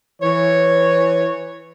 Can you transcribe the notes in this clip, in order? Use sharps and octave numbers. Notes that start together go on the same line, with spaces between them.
E3 C#5